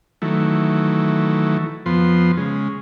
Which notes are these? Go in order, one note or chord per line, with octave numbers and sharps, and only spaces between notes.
D#3 E3 F#3 A3
F2 F3 B3 C6
C#3 G#3